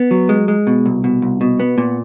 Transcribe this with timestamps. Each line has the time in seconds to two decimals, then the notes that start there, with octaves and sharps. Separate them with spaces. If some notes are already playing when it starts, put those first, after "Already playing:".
Already playing: B3
0.11 F#3
0.29 G#3
0.48 G#3
0.67 B2
0.86 C2
1.04 B2
1.22 C2
1.41 B2
1.60 B3
1.78 A#2